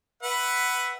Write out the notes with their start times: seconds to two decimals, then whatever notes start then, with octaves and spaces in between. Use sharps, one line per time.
0.23 B4 E5 F#5